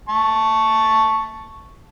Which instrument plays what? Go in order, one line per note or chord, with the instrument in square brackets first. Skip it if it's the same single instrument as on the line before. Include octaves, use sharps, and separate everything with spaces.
[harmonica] A5 C#6